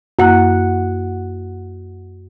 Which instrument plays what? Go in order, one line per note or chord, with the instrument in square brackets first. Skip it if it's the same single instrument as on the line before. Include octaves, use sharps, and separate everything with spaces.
[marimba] F#2 A#3 E4 [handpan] F#4 F#5